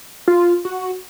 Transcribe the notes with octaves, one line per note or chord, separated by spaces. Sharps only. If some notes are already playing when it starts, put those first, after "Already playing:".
F4
F#4